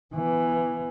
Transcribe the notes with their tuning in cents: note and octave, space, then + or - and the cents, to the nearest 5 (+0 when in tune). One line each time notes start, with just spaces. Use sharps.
E3 +10 B3 +0